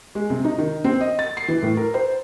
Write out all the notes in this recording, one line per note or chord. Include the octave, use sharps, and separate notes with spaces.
G#3
C3
D#4
D#3
C4
D#5
A6
C7
E3
A2
A#4
C5